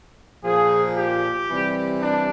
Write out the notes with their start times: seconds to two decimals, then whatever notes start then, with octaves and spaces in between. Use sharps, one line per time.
0.44 A#2 F3 G#4
0.96 G4
1.47 C3 E3 G3
1.99 D4